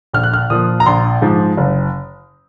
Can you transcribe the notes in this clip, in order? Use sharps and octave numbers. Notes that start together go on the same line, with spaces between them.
A#1 F6
F#6
F6
A#2 F3 D#6
A#5
A#1 C6
G#2 F3
F#1